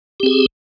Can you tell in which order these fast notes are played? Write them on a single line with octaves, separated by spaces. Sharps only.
G4 C4 G#4